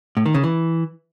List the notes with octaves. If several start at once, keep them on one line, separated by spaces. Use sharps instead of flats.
A2
D#3
C#3
E3